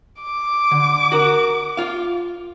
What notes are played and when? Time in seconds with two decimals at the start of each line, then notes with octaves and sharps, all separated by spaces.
0.22 D6
0.71 D3
1.12 F#4 A#4
1.77 F4 F5